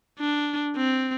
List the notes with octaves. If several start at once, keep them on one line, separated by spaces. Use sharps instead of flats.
D4
C4